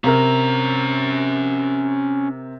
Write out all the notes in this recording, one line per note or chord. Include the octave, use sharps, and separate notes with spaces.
C3 C#4 A#4 A#5